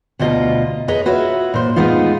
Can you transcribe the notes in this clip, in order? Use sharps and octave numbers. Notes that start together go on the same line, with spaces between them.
D2 B2 F4 D#5 F5 A#5
G#4 B4 C#5 D#5 A#5
F4 F#4 B4 C#5 E5
A#2 C5
A2 G#3 B3 D#4 F4